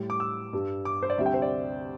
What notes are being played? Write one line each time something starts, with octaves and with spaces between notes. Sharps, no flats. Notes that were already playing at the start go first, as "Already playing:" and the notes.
Already playing: A2 G3
D6
E6
G2 G3
D6
C5
D5
D2 C3 G3 E5
G5
C5
D5